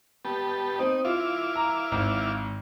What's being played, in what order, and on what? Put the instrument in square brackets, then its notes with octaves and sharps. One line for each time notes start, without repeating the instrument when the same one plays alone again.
[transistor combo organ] B3 G4 A5
[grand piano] C4 [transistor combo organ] D#4
[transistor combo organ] E4 F5 D6 [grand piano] F4
[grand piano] A#5
G#1